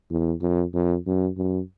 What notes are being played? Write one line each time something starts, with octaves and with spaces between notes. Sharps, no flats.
E2
F2
F2
F#2
F#2